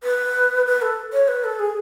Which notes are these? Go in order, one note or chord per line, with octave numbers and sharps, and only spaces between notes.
B4
B4
A4
C#5
B4
A4
G#4